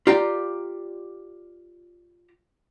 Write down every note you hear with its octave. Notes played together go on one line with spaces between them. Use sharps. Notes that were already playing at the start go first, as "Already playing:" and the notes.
F4 G4 D5 A#5